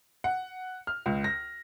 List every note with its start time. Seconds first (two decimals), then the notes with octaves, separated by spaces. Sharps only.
0.24 F#5
0.87 F6
1.06 C#2
1.24 A#6